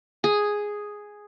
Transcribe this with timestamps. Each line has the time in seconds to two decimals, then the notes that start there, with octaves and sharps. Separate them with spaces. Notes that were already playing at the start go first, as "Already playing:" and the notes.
0.24 G#4